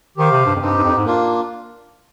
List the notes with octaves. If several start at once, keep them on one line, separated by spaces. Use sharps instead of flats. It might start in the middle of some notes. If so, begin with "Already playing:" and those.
D#3 G4 C5 F5
C3
G2
F2
G2 C4 D#4 G4
G2
F2
G#2
A#3 D4 F4